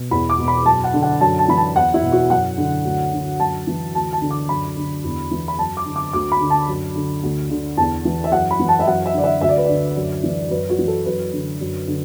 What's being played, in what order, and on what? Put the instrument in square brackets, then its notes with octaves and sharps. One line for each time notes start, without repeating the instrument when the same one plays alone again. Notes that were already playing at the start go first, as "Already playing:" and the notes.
Already playing: [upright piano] B2
E2 B5
D6
B2
B5
F#2 A5
F#5
D3
F#5
F#2 A5
A5
E3 B5
A5
E2 F#5
E4
B2
F#4
F#2 F#5
D3
D2
D3
F#2 A5
E3
D2 A5
A5
D3
D6
F#2 B5
D3
E2
E3
B5
F#2 A5
D6
D3
D6
D2 D6
B5
D3
A5
F#2
D3
D2
D3
E2 A5
E3
E5
F#2 F#5
B5
E3
A5
E5
F#2 F#5
E5
D3 D5
E5
D2 E5
D5
B4
D3 D5
F#2
E3
F#2 B4
F#4
E3
A4
F#2 B4
D3
F#2
D3